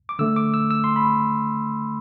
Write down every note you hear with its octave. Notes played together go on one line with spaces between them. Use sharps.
D6
D3 A3 E6
D6
E6
E6
C6
B5